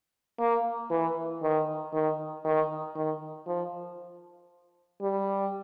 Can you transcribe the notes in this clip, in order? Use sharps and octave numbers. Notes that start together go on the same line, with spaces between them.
A#3
E3
D#3
D#3
D#3
D#3
F3
G3